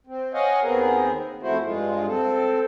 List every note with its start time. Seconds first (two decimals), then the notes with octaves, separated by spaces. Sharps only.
0.07 C4
0.34 C#5 D#5 F5 F#5 G#5
0.63 D#2 B3 C4 G#4 A#4
1.42 F2 A3 E4 F#4 C5
1.65 G2 G#3 F4
2.07 C4 A4